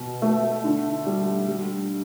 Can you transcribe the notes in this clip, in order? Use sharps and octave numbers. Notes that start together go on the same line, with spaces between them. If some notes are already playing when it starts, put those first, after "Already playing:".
Already playing: B2
A3
D3
G3
G3